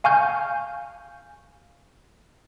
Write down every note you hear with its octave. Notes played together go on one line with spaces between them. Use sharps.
F5 G#5 C#6 F6 G6